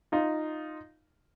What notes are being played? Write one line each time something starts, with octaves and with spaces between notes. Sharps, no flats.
D#4 F4